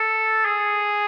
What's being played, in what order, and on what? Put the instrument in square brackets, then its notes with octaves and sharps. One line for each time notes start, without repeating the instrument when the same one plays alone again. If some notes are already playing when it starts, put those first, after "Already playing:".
Already playing: [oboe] A4
G#4